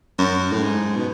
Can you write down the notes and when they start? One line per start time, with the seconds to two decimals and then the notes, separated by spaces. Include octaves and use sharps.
0.18 F#2
0.52 A2
0.63 G#2
0.97 B2